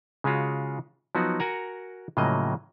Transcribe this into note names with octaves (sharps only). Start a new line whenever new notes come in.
C#3 G#3 C#4 F4 F#4
F3 F#3 B3 D#4 F#4
F#4 A#4 F#5 G#5 A#5
A2 C#3 F3 F#3 A#3 D#5